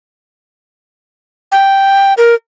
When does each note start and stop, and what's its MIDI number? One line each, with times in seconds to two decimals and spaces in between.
1.52 2.14 79
2.18 2.35 70